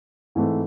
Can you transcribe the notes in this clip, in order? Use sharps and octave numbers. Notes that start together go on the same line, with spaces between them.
G#2 E3 A3 C4